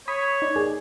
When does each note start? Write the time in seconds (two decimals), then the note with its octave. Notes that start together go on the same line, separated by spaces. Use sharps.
0.08 C#5 B5 D#6 B6
0.42 D#4 D5
0.56 G#4